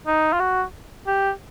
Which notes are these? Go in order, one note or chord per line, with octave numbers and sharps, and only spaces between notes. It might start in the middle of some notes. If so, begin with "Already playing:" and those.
D#4
F4
F#4
G4